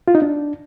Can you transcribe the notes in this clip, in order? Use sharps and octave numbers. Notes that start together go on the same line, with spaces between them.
F4
D#4
D4